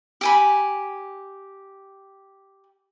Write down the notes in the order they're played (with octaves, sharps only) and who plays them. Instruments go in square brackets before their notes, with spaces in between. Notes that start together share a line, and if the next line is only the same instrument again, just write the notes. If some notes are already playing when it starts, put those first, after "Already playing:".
[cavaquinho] G4 G#5 B5